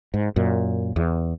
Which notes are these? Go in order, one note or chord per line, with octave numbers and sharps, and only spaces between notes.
G#2
F#2 A#2
E2